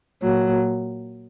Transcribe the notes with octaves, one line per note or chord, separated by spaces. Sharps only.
A#2 F#3